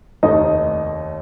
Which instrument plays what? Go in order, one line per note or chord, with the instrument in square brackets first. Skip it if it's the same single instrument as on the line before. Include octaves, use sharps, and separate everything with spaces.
[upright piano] F1 D#2 D#3 A3 D#4 [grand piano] D#5